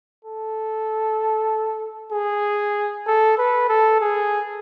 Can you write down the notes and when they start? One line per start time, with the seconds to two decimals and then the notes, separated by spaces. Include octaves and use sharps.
0.25 A4
2.12 G#4
3.07 A4
3.38 B4
3.69 A4
4.01 G#4